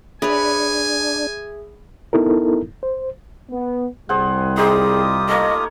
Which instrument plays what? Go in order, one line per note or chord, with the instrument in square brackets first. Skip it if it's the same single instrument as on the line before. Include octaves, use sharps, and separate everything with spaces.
[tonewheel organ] D4 [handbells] G#4 E5 [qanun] B4 C#5 [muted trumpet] G#5
[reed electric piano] B3 D#4 E4 A4 A#4
C5
[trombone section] B3
[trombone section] C2 G3 [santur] G#4 C5 F#5
[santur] D#4 G5 [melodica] F4 G4 D#6 [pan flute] G#4
[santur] A3 A#3 C#5 [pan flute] D#5